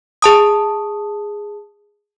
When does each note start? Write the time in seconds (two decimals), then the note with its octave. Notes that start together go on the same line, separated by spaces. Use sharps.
0.22 G#4 A5 D#6